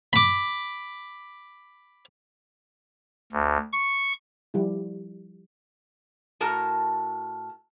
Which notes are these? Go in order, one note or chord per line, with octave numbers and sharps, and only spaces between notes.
B5 D6
D2
C#6
F3 G3 E4
A2 F#4 A#4 A5